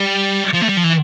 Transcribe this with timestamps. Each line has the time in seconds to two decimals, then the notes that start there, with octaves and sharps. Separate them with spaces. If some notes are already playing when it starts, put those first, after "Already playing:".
Already playing: G3
0.53 F3
0.61 A3
0.69 G3
0.77 F3
0.84 E3